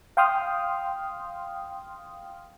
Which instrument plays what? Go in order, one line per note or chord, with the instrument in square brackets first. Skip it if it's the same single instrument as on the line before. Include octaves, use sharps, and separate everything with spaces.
[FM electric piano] F5 G5 C6 D#6 F6